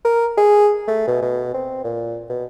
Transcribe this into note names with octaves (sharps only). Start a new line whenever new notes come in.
A#4
G#4
A3
B2
B2
C4
A#2
B2